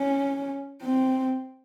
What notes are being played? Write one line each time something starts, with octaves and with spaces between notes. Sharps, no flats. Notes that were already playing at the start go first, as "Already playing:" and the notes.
Already playing: C#4
C4